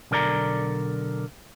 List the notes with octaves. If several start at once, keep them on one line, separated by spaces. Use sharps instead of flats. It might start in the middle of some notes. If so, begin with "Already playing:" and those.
B1 D3 A#4 D5 A#5